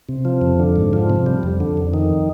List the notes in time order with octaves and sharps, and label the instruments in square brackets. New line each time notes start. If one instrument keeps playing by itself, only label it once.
[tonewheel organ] C3
F3
F2
D3
G#2
F3
C3
G3
F2
D3
F2
D#3